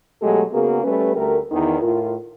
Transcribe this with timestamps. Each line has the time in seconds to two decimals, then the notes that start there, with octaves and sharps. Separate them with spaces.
0.22 B2 F#3 G#3 A3 G4 A4
0.52 C#3 A#3 B3 F#4 G#4 A#4
0.83 G3 A3 C#4 B4
1.15 D2 A3 G4 A#4
1.52 E2 D#3
1.81 A2 F4 A#4